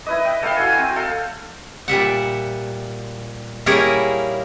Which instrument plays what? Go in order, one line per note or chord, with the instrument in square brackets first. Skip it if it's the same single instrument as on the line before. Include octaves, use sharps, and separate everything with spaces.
[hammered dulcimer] E4 B4 D#5
G5
A4 F5 G5
F#4 G#5
C4 G5
A4 F5
[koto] A#2 G3 E5 F#5
G3 A#3 C#4 E4 G#4 A#4